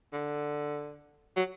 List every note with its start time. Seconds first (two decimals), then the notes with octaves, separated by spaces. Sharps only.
0.13 D3
1.36 F#3